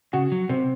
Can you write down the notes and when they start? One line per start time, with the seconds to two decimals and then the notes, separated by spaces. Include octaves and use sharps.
0.13 C#3 F#4
0.32 F#3
0.49 C3 C4